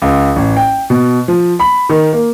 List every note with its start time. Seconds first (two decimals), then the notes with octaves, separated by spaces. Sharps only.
0.02 C#2
0.36 A1
0.57 G5
0.90 B2
1.28 F3
1.59 B5
1.89 D#3
2.13 A#3